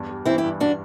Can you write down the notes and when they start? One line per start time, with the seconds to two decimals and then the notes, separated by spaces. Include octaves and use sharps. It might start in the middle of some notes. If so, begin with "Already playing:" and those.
Already playing: E2 G2
0.09 G3
0.25 E3 C4 E4
0.38 E4 G4
0.44 G2
0.60 D4 F#4